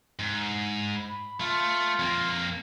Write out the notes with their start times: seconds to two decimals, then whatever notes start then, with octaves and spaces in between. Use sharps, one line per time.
0.19 G#2
0.96 B5
1.40 A3 F4
1.99 F2 A#3